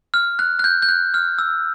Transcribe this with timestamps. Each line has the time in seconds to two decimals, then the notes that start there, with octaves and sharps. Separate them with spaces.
0.14 F6
0.39 F#6
0.59 F#6
0.64 G6
0.82 G6
0.89 F#6
1.14 F6
1.39 E6